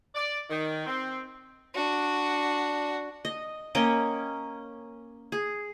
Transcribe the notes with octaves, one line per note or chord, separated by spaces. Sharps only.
D5
D#3
C4
D4 F#4
D#5
A#3 C#4 D#5 G5
G#4